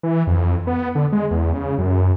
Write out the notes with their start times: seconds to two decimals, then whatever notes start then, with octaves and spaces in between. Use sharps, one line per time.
0.03 E3
0.27 F2
0.67 B3
0.95 D3
1.12 G#3
1.31 E2
1.54 C#3
1.78 F#2